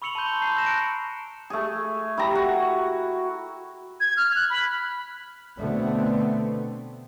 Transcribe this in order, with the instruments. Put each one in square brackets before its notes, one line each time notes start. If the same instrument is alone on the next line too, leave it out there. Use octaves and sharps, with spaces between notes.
[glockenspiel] B5 C#6 E6 C#7 F7 F#7
A5 B5 C6 G6 G7
A5 A#5 G6 C7
A5 E6 G6 A#6 E7
F#6 A#6 C#7 D7
[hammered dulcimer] A3 G#4
E4 G4 A#5
F#4
[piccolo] G#6
F6
F#6
B5
[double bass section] B2 D3 A3 B3 C4